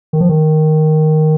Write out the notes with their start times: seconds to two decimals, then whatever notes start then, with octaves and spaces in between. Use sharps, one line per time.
0.13 D#3
0.21 F3
0.29 D#3